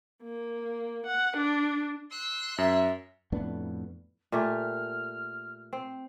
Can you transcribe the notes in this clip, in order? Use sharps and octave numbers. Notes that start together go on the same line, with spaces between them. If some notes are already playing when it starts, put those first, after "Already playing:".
A#3
F#5
D4
C6 E6 F#6
F#2 E5
F2 A2 B3 D4
A#2 A3 G4 F6
C4